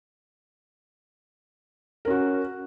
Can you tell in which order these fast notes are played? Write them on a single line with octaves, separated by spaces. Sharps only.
A#4 C#4 F#4